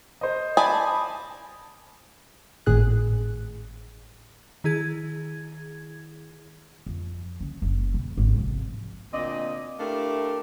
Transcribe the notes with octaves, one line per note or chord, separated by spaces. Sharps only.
C5 D#5
D5 G#5 A5 B5 D#6
G#1 A2 G#4 F#6
D#3 E4 G#4 G#6
F2
C#3
F#1
B2
G#1
C3 F3
D2 A#2 C4 D5 D#5
A3 D4 E4 G4 A#4 F5